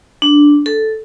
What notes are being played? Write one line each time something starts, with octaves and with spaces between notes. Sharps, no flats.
D4
A4